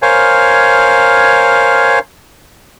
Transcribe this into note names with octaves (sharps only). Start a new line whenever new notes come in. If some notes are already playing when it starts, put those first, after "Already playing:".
A#4 C5 C#5 F5 G#5